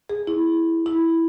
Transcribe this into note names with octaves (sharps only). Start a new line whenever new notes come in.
G#4
E4
E4